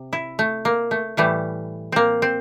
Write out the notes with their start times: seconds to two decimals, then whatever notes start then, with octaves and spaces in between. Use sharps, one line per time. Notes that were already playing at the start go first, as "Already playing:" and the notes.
Already playing: C3
0.13 E4
0.39 A3
0.65 A#3
0.91 A3
1.17 A2 E3 G3 A3
1.92 A#3 C4
2.22 C4